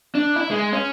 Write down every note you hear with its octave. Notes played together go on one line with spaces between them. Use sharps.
D4
E4
G#3
C#4